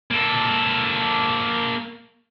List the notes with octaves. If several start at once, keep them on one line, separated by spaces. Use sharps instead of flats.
A#3 A4